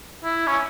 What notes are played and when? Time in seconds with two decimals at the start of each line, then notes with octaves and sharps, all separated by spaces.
0.24 E4
0.47 C#4